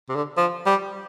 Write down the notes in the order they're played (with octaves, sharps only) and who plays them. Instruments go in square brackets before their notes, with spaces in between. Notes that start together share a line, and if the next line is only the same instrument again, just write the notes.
[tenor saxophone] C3
D3
F3
G3